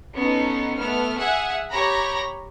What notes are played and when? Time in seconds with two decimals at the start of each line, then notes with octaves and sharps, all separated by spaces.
0.15 B3 C#4 D#4 A4
0.76 A3 B3 F6
1.17 G#4 E5 F#5 G#5
1.70 G4 C#5 A#5 B5 A#6